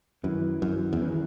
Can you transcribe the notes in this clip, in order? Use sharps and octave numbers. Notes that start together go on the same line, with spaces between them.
F#2 D#3 F#3 C#4 E4 B4
F#2
E2
D#3 F#3 C#4 E4 B4